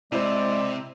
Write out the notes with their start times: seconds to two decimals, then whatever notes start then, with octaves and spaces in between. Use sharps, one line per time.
0.12 C3 G#3 E4 C5 D5